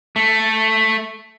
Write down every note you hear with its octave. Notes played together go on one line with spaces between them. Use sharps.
A3